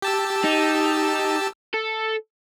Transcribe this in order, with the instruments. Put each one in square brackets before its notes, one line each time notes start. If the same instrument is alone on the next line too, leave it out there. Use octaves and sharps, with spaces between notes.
[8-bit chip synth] G4 A5 E6
[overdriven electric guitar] D#4
A4